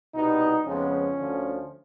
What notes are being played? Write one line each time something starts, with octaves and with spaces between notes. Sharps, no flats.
C2 B2 G3 B3 D#4
F2 C#3 F3 G#3 B3 C#4
D2 D3 F3